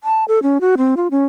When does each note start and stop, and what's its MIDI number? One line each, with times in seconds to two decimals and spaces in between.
0.04 0.24 81
0.28 0.39 69
0.43 0.58 61
0.61 0.75 66
0.78 0.95 60
0.97 1.08 65
1.11 1.26 61